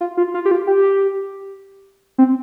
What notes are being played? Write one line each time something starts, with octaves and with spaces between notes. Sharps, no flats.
F4
F4
F4
G4
F4
G4
C4